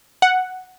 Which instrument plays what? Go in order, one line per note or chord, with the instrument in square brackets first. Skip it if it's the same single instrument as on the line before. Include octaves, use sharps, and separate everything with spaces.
[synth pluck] F#5